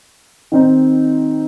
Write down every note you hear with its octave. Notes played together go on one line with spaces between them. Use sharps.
D#3 C4 D#4